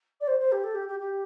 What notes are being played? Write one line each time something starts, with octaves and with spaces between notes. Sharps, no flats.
D5
C5
C5
G4
A4
G4
G4
G4